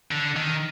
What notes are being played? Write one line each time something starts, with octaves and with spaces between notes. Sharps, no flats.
D3
D#3